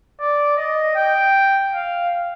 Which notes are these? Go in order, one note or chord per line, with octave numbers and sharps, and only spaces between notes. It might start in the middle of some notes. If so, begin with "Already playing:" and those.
D5
D#5
G5
F5